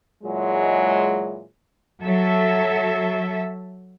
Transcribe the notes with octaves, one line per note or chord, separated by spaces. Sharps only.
A#2 E3 F#3 G#3
F#3 A4 E5